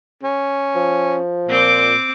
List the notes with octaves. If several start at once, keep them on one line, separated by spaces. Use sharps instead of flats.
C#4
F3
A#2 C4 D6